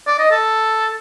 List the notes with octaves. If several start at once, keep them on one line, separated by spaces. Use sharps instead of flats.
D5
D#5
A4